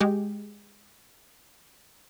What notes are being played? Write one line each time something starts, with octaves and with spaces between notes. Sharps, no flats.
G#3 G4